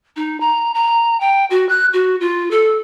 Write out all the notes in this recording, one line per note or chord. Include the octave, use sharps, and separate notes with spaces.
D#4
A#5
A#5
G5
F#4
F#6
F#4
F4
A4